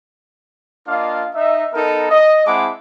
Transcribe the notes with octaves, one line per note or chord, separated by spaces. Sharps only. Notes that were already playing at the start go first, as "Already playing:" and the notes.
A#3 D4 F4 D#5 F5
D#4 E5
B3 D#4 A4 A#4
D#5
G#3 C4 E4 F#5 A5 D6